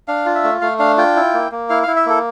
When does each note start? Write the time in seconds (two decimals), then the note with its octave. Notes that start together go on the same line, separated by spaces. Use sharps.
0.08 D4 F5
0.26 F4
0.35 E5
0.44 A3
0.61 A3 F5
0.79 D4 F5
0.97 F4 G5
1.16 E4
1.34 A#3
1.51 A#3
1.70 E4 F5
1.83 F5
1.88 E4
1.96 E5
2.06 A#3 A4